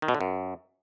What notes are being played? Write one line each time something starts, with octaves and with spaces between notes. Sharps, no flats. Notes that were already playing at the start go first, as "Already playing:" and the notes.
D#3
B2
D3
F#2